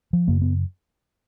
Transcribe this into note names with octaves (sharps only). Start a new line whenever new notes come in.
F3
F#2 C#3 A#3
B3